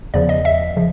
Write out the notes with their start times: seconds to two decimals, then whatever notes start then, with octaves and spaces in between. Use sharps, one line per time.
0.14 E2 C#3 F3 D5
0.29 D#5
0.45 E5
0.76 C#3 F3